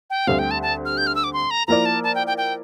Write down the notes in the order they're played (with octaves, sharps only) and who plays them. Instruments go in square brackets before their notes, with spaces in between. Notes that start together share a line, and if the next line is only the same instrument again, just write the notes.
[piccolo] G5
[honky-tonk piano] D2 D3 G3 C4 [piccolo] F5
[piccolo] G5
A5
A5
F6
G6
F6
E6
D6
C6
A#5
[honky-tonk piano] F3 A#3 E4 A#4 D5 [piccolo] A#5
[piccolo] A5
A5
G5
G5
G5